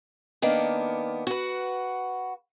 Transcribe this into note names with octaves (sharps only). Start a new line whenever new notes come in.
D#3 A#3 B3 D4
F#4 B4